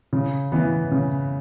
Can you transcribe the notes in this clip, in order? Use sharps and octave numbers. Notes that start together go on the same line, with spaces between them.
C#3
E3 B3
C#3